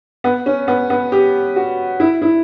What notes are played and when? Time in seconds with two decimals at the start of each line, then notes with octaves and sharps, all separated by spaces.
0.24 B3
0.46 C#4
0.68 B3
0.90 B3
1.12 G4
1.56 F#4
2.00 E4
2.22 E4